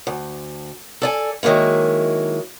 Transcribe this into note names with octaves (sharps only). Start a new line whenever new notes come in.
D2
A4 D5 G#5
D#3 F#3 G#3 A#3 E4